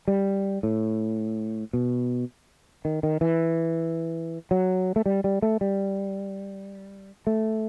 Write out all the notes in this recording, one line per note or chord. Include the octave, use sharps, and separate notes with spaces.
G3
A2
B2
D#3
D#3
E3
F#3
A3
G3
G3
A3
G3
A3